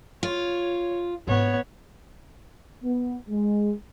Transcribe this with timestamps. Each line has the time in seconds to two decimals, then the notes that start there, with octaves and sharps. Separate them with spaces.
0.23 F4 C#5
1.27 G#2 B3 D4 C#5
2.83 B3
3.29 G#3